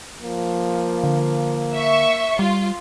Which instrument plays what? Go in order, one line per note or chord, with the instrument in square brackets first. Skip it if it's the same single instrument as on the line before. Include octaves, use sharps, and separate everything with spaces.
[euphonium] F3 [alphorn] A#3
[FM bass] D3
[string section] E5 C#6
[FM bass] G3 [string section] F4